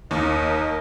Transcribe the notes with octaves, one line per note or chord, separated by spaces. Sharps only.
D#2 A#4 D#5